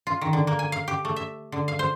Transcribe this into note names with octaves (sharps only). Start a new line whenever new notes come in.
F4
D#3
D3
A#3
G#5
F5
G4
A3
E5
D3
F5
C5